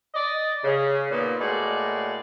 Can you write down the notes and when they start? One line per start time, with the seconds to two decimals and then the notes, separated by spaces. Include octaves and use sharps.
0.14 D5 D#5
0.64 C#3
1.10 A#2 B3 D#4
1.40 A2 G#3 A#3 F#4 D5